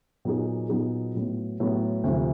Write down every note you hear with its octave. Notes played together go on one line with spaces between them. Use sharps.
A#2 F#3 B3 D#4 G#4
A#2 F#3 B3 D#4 G#4
A2 F#3 B3
A2 F#3 B3
D2 C3 F3